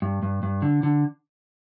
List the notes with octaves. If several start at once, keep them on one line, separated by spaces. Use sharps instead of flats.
G2
G2
G2
D3
D3